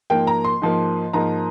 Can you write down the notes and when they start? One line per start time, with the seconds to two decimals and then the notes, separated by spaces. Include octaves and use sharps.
0.10 G#2 F3 A#3 G5
0.27 A#5
0.44 C6
0.62 G#2 F3 A#3
1.13 G#2 F3 A#3 A#5